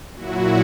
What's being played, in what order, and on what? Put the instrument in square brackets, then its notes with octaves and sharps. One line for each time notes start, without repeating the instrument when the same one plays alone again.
[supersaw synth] A#2 F#3 E4 F#4